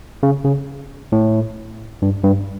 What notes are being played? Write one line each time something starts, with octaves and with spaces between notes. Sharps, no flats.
C#3
C#3
A2
G2
G2